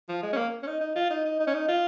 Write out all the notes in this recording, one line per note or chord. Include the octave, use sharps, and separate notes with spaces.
F3
G#3
C#4
A#3
C#4
D#4
D#4
F4
D#4
D#4
D#4
C#4
D#4
F4